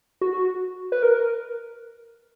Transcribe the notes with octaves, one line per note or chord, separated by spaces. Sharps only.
F#4
B4
A#4